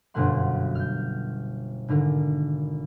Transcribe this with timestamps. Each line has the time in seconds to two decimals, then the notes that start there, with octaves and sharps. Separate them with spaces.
0.14 G1 F#2 B2 A#3 F#5 C6
0.75 F6 G6
1.88 G#1 D3 A#4